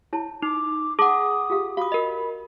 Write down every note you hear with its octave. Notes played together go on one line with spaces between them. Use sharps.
E4 C#5 A5
D#4 D6
G#4 F#5 A5 D6 D#6
F4 G4 F5
F#4 F5 B5 D#6
A#4 D#5